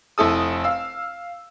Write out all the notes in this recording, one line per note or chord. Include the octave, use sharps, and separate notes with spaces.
F1 E4 A4 D#6
F5 E6